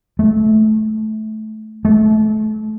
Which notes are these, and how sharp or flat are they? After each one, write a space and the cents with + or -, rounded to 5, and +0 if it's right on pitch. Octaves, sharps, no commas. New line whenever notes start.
A3 -20
A3 -30